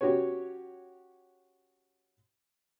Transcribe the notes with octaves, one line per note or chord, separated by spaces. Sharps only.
C#4 F#4 G4 B4 C#5